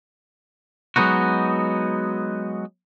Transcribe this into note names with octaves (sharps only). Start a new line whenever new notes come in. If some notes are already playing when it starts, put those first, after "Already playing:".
F#3 G#3 B3 D#4 F#4